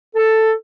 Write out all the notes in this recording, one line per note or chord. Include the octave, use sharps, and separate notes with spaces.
A4